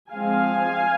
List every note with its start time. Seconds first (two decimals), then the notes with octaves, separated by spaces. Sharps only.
0.13 F3 G#3 C4 F5 G#5